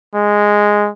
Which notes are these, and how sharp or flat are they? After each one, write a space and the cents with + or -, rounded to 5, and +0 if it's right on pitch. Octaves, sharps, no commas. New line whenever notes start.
G#3 -5